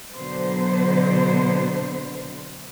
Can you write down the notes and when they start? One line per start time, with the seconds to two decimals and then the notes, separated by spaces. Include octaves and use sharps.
0.14 B2 D3 F#3 B3 C5